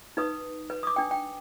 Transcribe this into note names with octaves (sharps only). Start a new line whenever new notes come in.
D#4 B4 D#6
B4
D6 D#6
D4 G5
G5